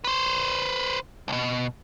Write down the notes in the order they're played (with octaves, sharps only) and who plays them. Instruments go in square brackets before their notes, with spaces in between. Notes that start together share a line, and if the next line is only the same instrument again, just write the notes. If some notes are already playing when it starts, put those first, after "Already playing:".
[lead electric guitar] B4 C5
C2 B2